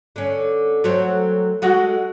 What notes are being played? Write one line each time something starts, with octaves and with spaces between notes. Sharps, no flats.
D3 C#4
F#3 A3 C4
G#3 F#4 A4